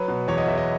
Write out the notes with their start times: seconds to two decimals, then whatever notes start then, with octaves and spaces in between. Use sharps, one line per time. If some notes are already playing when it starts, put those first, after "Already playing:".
Already playing: F#3 B4
0.08 B2
0.28 E2 C#5
0.38 D#5
0.48 E2 E5
0.57 D#5